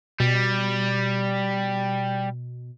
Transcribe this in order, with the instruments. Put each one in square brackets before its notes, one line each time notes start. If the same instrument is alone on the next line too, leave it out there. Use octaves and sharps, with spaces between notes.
[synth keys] B2 [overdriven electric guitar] G3